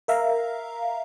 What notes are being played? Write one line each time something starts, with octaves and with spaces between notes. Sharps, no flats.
A#4 E5 F5 A#5